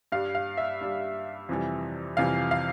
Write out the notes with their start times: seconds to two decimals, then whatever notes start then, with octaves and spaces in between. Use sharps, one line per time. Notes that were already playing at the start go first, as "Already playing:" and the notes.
0.12 G2 G3 F5
0.35 F5
0.57 E5
0.81 G2 G3
1.49 F2 C3 E3 G3
2.17 F2 C3 E3 G3 F5
2.51 F5